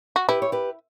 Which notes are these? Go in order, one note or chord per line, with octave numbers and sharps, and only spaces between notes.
F#4
E4 G4 B4
C#5
G4 B4